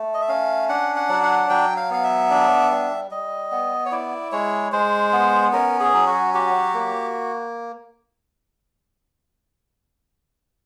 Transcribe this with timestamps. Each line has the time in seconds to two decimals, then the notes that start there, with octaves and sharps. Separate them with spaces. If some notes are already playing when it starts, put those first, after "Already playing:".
Already playing: A3
0.14 D#5
0.21 E5
0.29 C#4 F5
0.69 D4 F#5
0.96 F#5
1.09 F#3
1.23 F#5
1.50 F#3 G5
1.77 F5
1.90 B3 F5
2.04 E5
2.31 D4
2.71 G3
3.11 G3 D#5
3.52 B3
3.86 C#5
3.92 E4 D5
4.32 G#3 C#5
4.72 G#3 C5
5.13 B3
5.53 C#4 A#4
5.80 G#4
5.93 F#3
6.07 F#4
6.34 F#4 G4
6.74 A#3